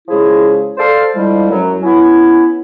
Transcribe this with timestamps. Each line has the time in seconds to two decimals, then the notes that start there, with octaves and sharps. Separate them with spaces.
0.08 C#3 F3 G#3 E4 G#4
0.78 A4 C5 D5 F5
1.14 D3 F3 G3 G#3 E4
1.50 F#2 F#3
1.83 B3 C#4 E4